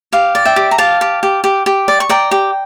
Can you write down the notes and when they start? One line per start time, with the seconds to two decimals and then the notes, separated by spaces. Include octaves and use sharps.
0.13 G4 F5
0.35 D5
0.45 E5 G5
0.56 G4
0.71 A#5
0.78 G4 F5 A5
1.01 G4
1.23 G4
1.44 G4
1.66 G4
1.88 D5
2.00 C#6
2.09 D5 G5 A#5
2.31 G4